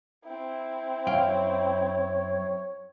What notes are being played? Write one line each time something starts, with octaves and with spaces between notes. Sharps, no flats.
C4 E4
F#2 C#5 F5 G5